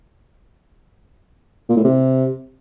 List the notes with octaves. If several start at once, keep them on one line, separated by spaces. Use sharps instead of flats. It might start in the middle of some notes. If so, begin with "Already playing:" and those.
A#2
A2
C3